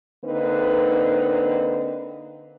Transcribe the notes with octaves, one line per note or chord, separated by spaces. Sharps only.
D3 A#3 C4 D#4 B4